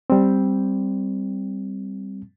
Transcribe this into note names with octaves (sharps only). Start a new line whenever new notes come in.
G3 C4